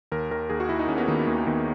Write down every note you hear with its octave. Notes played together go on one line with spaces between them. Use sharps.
D#2 A#4
D#3 A#4
D#2 G#4
F#4
D#3 E4
D#4
D#2 C#4
B3
D#3 A#3
D#2 A#3
D#3 B3